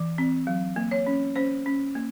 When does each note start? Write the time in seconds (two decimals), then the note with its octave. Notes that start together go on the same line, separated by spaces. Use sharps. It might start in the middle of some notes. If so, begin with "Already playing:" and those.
Already playing: E3
0.18 C4
0.47 F#3
0.76 A#3
0.91 C#5
1.07 C#4
1.36 C#4 C5
1.66 C#4
1.95 A#3